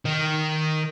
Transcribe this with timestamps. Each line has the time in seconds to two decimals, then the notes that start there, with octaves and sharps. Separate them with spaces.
0.05 D#3